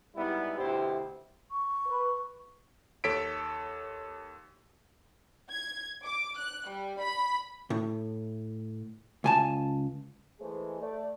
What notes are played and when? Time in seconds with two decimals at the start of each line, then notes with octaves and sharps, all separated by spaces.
0.15 G#2 G3 B3 E4
0.57 D2 B2 E4 G4 C5
1.51 C#6
1.88 B4
3.04 D#2 A4 C#5 B6 D7
5.49 G#6
6.03 D6
6.36 F#6
6.68 G3
6.99 B5
7.70 A2
9.24 C#2 G#5 A5
10.41 E3 G#3 A3 G#4 C5
10.81 A3 D5